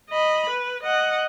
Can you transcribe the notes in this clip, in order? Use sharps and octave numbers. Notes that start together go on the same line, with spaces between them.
D#5 B5
B4
D#5 F#5